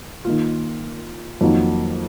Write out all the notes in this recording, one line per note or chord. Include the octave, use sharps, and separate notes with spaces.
D#3 A#3 F4
F2 D#3 F#3 A#3 D#4